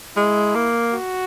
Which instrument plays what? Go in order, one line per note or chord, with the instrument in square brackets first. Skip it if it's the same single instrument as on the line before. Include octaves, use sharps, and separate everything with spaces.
[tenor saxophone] G#3 [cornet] E4
[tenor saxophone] A#3
[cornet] F#4